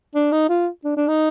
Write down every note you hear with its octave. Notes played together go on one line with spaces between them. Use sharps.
D4
D#4
F4
D4
D4
D#4